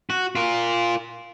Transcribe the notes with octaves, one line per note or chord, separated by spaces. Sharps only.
F#4
F4 A#4